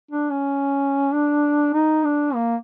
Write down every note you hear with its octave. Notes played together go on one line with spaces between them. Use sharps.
D4
C#4
D4
D#4
D4
A#3